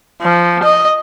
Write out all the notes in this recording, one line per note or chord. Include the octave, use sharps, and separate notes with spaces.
F3
D#5